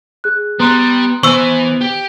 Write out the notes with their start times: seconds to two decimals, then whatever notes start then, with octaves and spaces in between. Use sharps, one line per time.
0.24 G#4 F#6
0.60 G3 B3 A#5 C6 F#6
1.23 E3 B3 C5 G#5 C#6 E6
1.81 G4